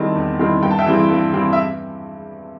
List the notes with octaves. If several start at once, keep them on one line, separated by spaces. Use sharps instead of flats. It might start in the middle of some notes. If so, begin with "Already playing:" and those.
Already playing: D#3 G3 C4 E4 A5
E2
D#3 G3 C4 E4
G2 G5
A5
E5 G5
E3 G3 C4 E4
G2
E3 G3 C4 E4
E5